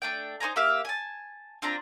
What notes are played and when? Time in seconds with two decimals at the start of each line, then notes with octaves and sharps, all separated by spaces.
0.02 A3 D4 G5
0.40 D#4 C5 G#5 A#5
0.56 A#3 G4 E5 F5
0.85 G#5 A5
1.62 C4 D4 F4 A#5